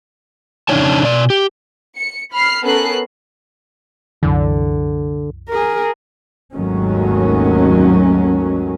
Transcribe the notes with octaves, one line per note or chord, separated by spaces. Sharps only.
F2 C#3 D4 D#4 C#5 A5
B2 D5
G4
C#7
B5 F6 C7
B3 C#4 A4 A#4 F#6 C7
C2 F#2 D3 E3
G#4 A#4
G#1 D#2 D#3 F#3 A3 C#4